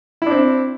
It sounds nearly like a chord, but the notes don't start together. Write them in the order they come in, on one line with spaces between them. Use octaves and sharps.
E4 D4 C4